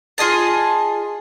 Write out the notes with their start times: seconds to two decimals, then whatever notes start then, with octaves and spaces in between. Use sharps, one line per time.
0.18 F4 G#4 D#5 A5